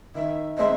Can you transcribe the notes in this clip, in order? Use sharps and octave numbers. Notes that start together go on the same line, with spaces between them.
D#3 E5
G#3 C4 D#4 E5